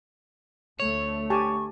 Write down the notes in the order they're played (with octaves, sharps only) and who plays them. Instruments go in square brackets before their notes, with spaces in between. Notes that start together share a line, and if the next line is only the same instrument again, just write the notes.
[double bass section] D2 A3 [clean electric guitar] C#5
[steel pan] G4 G#5 A5 [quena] C#6